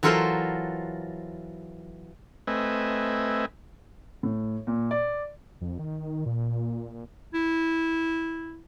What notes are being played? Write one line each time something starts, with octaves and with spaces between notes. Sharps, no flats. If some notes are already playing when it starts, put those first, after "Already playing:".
E3 F#3 F4 A4 A#4 C5
A3 C4 B4 D#5 E5 G#5
A2
A#2
D5
F2
D#3
A#2
E4